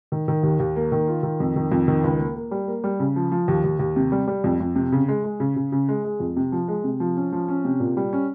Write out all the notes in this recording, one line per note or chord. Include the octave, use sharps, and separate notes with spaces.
D#3
D#3
D#2
D#2
A#3
D#3
F4
D#3
F2
D#3
F2
D#3
C#2
A#3
A#3
G3
A#3
G3
C#3
F3
F3
D#2
D#2
D#2
C3
G3
G3
F2
F2
C3
C#3
G#3
G#3
C#3
C#3
C#3
G#3
G#3
F2
C3
F3
G#3
C3
F3
C#4
F3
C#4
C3
A#2
G3
C#4